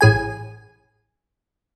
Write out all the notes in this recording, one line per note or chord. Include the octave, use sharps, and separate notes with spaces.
A1 G#4 G#5